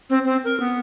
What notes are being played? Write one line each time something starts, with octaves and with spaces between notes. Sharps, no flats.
C4
C4
A#4
B3